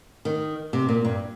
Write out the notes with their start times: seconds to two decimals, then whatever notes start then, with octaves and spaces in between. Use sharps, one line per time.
0.25 D#3
0.73 C3
0.89 A#2
1.05 G2